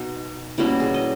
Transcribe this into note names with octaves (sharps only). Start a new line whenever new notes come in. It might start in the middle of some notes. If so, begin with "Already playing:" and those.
Already playing: B2 D#4
B2 G3 A#3 C#4 E4
G#4
D#5